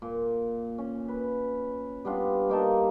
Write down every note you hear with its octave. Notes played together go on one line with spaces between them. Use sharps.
A#2
C#4
B4
G3 B3 D4 F4
A#3 D#4 A5